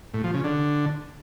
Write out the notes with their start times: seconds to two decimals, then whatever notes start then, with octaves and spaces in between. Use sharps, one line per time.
0.14 A2
0.24 F3
0.34 C#3
0.44 D3